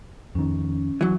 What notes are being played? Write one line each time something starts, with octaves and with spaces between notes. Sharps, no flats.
F2 D#3 C#4
E3 F#3